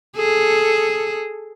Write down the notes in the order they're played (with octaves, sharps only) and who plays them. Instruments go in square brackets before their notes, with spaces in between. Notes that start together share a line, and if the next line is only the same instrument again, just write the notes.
[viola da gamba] G#4 A4